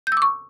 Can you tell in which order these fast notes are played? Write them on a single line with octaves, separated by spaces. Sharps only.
G6 E6 D6 C#6